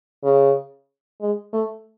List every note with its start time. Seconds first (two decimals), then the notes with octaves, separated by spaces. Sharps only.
0.24 C#3
1.21 G#3
1.53 A3